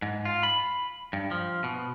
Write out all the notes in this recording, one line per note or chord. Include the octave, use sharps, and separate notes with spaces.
G#2
F4
B5
G2
F3
B2